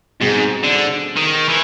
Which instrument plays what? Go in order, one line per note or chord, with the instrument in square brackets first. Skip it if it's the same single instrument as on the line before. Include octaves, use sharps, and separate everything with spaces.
[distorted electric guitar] G#2 [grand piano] B2 G3 C4 D#4 G#4
[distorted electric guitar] D3
D#3
E3